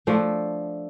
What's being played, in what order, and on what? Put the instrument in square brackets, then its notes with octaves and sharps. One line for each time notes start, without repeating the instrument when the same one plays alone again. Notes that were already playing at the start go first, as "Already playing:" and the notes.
[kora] F3 A3 D4